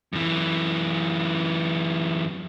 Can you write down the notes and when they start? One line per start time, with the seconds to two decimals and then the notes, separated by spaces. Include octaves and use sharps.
0.13 F#2 E3